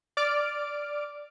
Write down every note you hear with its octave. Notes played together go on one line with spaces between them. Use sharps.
D5 D6 F6 D7